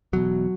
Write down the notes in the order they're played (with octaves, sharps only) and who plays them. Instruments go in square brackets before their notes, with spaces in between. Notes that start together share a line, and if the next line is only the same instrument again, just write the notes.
[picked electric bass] E1 E2 B2 F#3